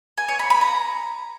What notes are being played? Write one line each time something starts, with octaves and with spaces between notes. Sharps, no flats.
G#5
C#5
B5
B5
A#5